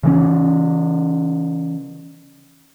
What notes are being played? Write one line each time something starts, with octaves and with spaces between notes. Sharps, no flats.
C#3 E3 C#4